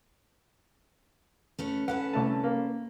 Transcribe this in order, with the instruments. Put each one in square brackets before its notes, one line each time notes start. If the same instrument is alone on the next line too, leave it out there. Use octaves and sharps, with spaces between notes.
[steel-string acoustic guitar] A3 C#4 B4
[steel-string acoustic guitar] C#4 A4 B4 [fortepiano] F#5
[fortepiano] C2 A3 A5
A#3